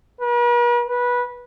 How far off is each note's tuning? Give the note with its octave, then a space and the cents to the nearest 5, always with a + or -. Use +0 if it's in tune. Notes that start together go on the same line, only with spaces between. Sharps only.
B4 -45
B4 -15